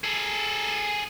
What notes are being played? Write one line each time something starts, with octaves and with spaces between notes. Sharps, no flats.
G#4 A4